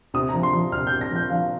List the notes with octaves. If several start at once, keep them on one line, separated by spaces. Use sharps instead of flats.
C3 D#6
A#5
F3
C6
F3
C3 F6
G6
C3
A#6
F3 G6
F3 F5